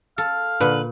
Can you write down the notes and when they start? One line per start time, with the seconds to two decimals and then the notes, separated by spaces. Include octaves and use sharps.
0.18 A4 F5
0.61 A#2 D3 B4